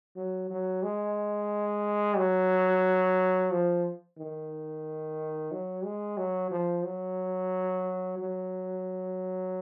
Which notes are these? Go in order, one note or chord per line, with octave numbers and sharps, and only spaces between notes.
F#3
F#3
G#3
F#3
F3
D#3
F#3
G#3
F#3
F3
F#3
F#3